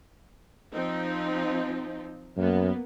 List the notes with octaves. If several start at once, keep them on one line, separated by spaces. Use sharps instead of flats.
F3 C4 D#4
F#2 A#3 B3